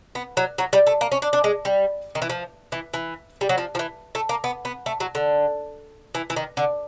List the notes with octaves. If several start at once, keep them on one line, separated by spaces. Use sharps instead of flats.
B3
F#3
F#3
G3
A3
A#3
C#4
D4
D4
G#3
G3
D#3
E3
F3
E3
E3
G3
F#3
F3
F3
E3
A3
A#3
B3
B3
A3
F#3
D3
E3
E3
D#3
D3